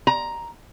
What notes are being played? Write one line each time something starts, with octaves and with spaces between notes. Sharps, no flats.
A#5